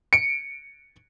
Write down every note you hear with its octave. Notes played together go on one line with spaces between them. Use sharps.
C#7 D7